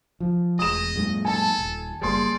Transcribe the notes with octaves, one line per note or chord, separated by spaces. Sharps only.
F3
E1 G#4 D#5 D#6 E7
F#2 A#2 G#3
A4 G#5 A5
D#1
F#1 G3 A#3 G#4 D5 C6